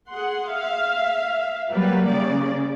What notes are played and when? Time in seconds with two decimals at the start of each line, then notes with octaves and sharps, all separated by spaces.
0.10 G#4 F#5 C6
0.53 E5 F5
1.71 F#3 G3 A#3 G4 B4
2.07 C#3 D5